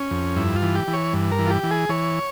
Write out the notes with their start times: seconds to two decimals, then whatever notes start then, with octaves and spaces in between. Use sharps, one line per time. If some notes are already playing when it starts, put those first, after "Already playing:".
Already playing: C#4
0.11 F2
0.36 G2 E4
0.56 F4
0.62 E3
0.75 G4
0.87 E3
0.93 C#5
1.13 G2
1.32 A#4
1.39 E3
1.46 F4
1.50 G4
1.63 E3
1.71 G#4
1.89 E3 C#5